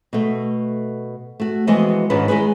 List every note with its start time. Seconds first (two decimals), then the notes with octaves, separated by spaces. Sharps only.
0.13 B2 A3
1.40 A3 F#4
1.67 F2 E3 G#3 B3 F#4 D#5
2.10 G#2 D3 D#3 C#4 F4 B4
2.28 D#3 G#3 E4 G#4 B4